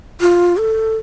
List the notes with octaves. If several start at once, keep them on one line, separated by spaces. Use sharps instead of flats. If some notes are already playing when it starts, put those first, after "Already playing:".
F4
A4